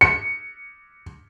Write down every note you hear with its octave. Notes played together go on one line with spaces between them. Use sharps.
C#7